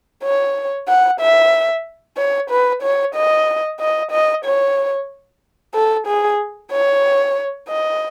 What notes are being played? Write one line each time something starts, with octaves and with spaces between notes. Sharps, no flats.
C#5
F#5
E5
C#5
B4
C#5
D#5
D#5
D#5
C#5
A4
G#4
C#5
D#5